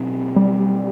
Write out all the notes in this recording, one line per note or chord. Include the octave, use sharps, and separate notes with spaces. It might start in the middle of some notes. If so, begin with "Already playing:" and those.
Already playing: B2 F#3 C4
G3